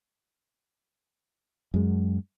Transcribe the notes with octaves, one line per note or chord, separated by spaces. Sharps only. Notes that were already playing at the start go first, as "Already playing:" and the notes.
F#2 G#3